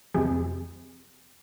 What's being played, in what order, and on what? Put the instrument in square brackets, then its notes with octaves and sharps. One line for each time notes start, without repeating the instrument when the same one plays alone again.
[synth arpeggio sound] F2 C3 F3 G#4